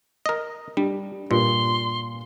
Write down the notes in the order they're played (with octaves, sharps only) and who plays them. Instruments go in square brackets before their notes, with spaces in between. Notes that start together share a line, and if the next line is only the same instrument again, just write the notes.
[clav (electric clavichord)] A#4 D#5
[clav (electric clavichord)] G3 [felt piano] D4
[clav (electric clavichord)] G2 [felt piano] A#2 [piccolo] C6